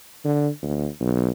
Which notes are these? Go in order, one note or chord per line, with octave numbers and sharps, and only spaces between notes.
D3
D2
B1